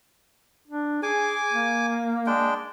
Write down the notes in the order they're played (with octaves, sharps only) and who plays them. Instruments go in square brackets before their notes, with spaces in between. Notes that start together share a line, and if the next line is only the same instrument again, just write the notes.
[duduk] D4
[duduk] G#4 [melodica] G#5 D6
[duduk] A#3
[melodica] G#3 D4 G5